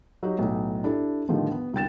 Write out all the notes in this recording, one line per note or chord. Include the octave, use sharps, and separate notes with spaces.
F#3 D#4 G4
B1 A2
D4 E4 G4 A4
A2 D3 D#3 F3 G3
B3
C2 D3 G5 A6 E7